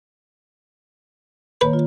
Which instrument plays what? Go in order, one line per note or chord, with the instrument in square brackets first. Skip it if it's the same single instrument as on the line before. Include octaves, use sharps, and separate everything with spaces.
[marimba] D#3 A#3 C#5 [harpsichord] B4
[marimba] F4